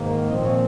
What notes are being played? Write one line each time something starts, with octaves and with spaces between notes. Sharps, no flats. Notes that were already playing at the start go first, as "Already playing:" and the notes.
Already playing: G#2 D#3 A#3
A#2 F3 C4 D#5
C#5